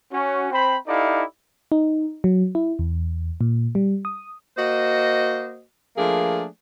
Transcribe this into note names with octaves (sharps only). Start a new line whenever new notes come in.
C#4 F#4
C4 C5 G5 B5
D#4 E4 G4 A4 D5 F5
D#4
F#3
E4
E2
A#2
G3
D#6
A#3 F#4 C5 D#5
F3 A3 A#3 D4 G#4